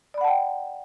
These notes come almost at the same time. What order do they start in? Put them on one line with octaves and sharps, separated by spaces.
D5 B5 F#5 A5 G5